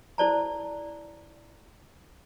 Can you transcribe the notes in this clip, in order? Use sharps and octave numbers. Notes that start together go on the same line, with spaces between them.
E4 A4 C5 D5 A5 A#5